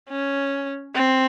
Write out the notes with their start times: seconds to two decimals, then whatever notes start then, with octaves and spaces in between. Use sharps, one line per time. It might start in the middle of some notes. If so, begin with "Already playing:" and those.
0.10 C#4
0.95 C4